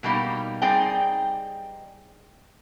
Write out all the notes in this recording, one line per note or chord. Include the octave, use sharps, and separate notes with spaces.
B2 G3 A#3 D#4 G4
G3 C4 D#4 G#4 D5 G5